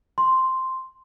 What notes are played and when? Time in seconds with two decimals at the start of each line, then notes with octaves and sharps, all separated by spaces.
0.18 C6